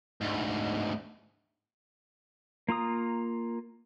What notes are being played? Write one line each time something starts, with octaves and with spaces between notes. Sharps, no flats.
D2 G#2
A#3 F4 A#5 D#6